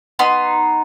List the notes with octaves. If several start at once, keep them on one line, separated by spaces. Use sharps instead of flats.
B3 D#4 C6